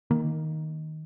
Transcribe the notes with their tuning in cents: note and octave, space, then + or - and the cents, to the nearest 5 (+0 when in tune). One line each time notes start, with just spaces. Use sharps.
D#3 +5 A#3 +0